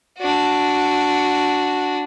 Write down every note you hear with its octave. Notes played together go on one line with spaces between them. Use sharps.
D4 F#4